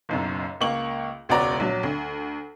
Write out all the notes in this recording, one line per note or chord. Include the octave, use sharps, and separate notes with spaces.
F#1 B1 F#2
C#2 A#3 C#6 F#7
E1 C#2 F#4 C#5 D5 A#5
A#1 F#3
D2